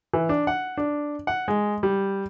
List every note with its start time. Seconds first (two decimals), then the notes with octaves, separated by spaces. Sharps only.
0.13 E3
0.29 D4
0.47 F#5
0.77 D4
1.27 F#5
1.48 G#3
1.83 G3